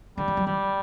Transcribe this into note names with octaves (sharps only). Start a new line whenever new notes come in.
D3 G3
E3
F#3
E3 G3